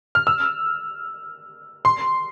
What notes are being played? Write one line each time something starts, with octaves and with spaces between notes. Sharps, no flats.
F6
E6
C6